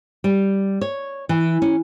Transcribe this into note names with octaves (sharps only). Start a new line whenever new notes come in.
G3
C#5
E3
C#4